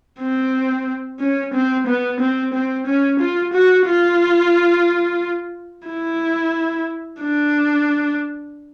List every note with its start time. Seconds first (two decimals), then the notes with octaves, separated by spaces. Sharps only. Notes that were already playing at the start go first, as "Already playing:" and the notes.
0.20 C4
1.20 C#4
1.53 C4
1.87 B3
2.20 C4
2.53 C4
2.86 C#4
3.19 F4
3.53 F#4
3.86 F4
5.87 E4
7.20 D4